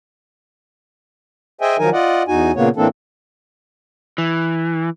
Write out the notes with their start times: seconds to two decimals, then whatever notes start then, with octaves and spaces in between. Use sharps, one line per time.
1.61 G#4 C5 D#5 E5 G5 G#5
1.79 D#3 F3 F#3 D#4 A#4 G#5
1.93 F4 D5 D#5 F#5
2.28 E2 D#4 F#4 G#5
2.55 A#2 C#3 A#3 B3 C#5
2.76 A2 E3 A#3 C4 D4 A4
4.18 E3